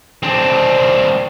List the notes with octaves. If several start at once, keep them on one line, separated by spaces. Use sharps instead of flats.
C4 D4